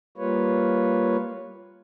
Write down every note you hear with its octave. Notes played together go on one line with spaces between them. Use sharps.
G3 A#3 F4 B4 C#5